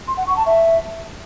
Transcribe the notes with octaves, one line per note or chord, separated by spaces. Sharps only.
C6
F#5
C#6
A5
E5